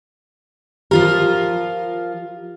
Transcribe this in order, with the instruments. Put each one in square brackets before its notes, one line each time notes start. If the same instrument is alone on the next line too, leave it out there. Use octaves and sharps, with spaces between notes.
[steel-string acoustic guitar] F3 F4 A#4 [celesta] G4